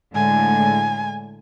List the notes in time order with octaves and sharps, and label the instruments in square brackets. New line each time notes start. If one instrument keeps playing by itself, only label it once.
[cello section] A2 D3 G#3 [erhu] G#5